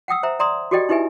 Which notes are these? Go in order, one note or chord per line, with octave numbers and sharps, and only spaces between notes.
F#5 G5 D#6 E6
C5 E5 A#5
D5 A#5 C6 D#6
F#4 G4 A4 D5 D#5 G5
D#4 E4 G4 B4 E5 G#5